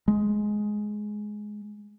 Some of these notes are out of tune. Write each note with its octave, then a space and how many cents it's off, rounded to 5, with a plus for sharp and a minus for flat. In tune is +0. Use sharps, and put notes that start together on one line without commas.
G#3 +10